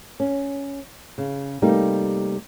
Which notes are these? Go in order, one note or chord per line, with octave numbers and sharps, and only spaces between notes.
C#4
C#3
C3 G3 A3 A#3 D#4 G4